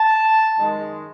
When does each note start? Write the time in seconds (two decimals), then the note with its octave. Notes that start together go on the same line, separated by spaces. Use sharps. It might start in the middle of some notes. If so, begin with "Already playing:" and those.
Already playing: A5
0.58 F#2 D#3 G#3